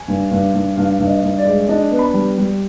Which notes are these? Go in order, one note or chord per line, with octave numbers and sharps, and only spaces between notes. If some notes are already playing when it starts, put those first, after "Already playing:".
Already playing: G#5
G2
G2
G2
G2 F5
G2
D#5
G2
D5
G#3
D4 D#5
B3
B5
G3
G3